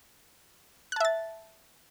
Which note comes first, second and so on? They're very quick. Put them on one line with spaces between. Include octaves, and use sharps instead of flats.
F#6 A5 E5 A6